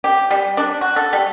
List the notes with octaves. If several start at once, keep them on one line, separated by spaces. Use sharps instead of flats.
G4
G3
D4
F#4
A4
G3